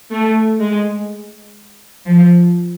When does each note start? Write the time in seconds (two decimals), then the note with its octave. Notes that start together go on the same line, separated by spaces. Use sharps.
0.11 A3
0.60 G#3
2.07 F3